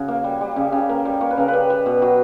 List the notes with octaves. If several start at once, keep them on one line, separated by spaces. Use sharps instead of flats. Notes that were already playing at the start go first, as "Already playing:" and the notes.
Already playing: C#3 F#4
A#3
G3
G3
C#3 G4
C#3
G4
A#3 A#4
G3
A#3 C#5
B4
C#3 A#4
B4
G3
G3
B2
F#3